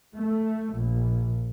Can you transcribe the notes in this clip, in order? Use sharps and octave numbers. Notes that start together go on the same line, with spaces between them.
A3
A#1